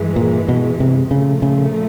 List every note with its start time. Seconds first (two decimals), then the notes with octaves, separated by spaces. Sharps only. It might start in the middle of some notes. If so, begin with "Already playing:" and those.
Already playing: G2 E3 G#3
0.16 A#2
0.49 B2
0.80 C3
1.11 A#2 C#3 F3 A3
1.42 C#3